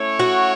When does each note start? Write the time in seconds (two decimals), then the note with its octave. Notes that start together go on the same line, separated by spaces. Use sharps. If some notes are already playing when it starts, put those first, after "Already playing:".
Already playing: A3 C#4 E4 C#5
0.19 F#4